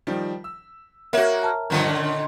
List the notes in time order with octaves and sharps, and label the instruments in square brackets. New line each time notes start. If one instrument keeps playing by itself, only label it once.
[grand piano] D#3 F3 G3
E6
[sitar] A#3 F#4 [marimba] A#4 C#5 E5
[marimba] A5 A#5 F6
[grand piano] G2 F3 C#7 [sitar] A#2 D3 D#3
[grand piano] C#4 D4